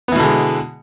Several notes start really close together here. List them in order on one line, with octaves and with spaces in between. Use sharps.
B3 E3 B2 D3 G#3